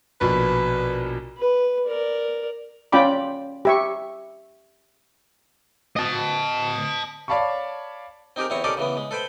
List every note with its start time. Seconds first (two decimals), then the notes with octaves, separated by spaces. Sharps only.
0.21 A#1 B2 B4
1.38 B4
1.86 A#4 D5
2.92 C#4 F4 D5 G5 B5 D6
3.65 G4 E5 C#6
5.96 D#5 A5
7.28 C#5 D5 F5 A5 B5 C#6
8.36 C4 D#4 G4 G#4 A#4
8.50 E2 C4 E4 C#5 C#6 D#6
8.64 C#4 G4 A4 A#4 D5 D#5
8.77 C#3 E3 B3
8.97 G#3
9.11 A4 B4 C5 G5 B5